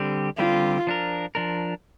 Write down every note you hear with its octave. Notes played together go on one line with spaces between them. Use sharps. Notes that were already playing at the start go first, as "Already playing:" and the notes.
Already playing: D3 G3 C4 G4
D3 G3 C4 F4 G4
F3 D4 A#4
F3 D4 A#4